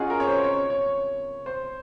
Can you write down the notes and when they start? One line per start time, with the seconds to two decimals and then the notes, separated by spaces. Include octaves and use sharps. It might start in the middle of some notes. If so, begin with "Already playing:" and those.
Already playing: C#4 D#4 F4 F#4 G#4
0.10 A#4
0.20 C#5
0.27 C5
0.44 C#5
0.70 C#5
1.46 C5